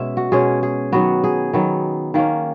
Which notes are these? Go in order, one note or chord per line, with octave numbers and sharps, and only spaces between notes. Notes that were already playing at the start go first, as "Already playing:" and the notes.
Already playing: B2 G#3 C#4 E5
F#4
B2 G#3 C#4 G#4
G#4
D#3 F#3 B3 F#4
G#4
D#3 F#3 B3
D#3 A#3 C#4